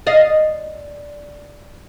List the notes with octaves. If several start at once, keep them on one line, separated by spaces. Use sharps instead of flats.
D5 D#5 F5